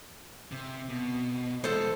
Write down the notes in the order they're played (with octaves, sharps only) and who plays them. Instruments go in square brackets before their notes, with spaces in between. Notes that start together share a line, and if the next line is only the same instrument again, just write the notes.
[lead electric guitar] C3
B2
[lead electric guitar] E3 G#3 [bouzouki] A4 C5